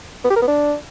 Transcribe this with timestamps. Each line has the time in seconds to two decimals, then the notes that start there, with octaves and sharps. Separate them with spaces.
0.24 B3
0.30 G4
0.36 A#4
0.42 B3
0.47 D4